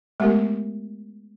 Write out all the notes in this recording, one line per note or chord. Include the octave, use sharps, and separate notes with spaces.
G#3 A3 B3 G4 A#4